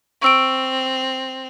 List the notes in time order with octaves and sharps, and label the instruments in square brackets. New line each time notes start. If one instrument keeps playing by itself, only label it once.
[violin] C4 [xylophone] C#6 E6 D7